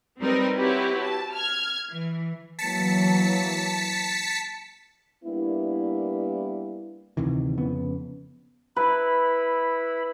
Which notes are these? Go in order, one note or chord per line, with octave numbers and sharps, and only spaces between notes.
G3 C4 D#4 A#4 B4
C4 E4 F#4 G4 B4 C#5
A5
F6 G#6
E3
E3 F#3 A#3 A5 B6 C#7
G3 A#3 B3 D4 E4
D2 C3 D#3 E3
F2 C#3 B3
E4 B4 B5